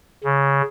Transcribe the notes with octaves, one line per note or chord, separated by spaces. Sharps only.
C#3